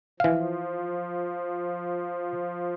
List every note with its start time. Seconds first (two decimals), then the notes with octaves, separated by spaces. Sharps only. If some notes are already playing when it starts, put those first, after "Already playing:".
0.20 E3 F3 F5